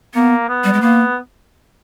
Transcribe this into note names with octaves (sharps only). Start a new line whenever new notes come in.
A#3 B3
B3
G3
G#3
A#3 B3